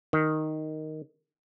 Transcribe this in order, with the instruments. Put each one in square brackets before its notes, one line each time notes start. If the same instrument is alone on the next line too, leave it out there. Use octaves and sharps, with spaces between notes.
[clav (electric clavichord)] D#3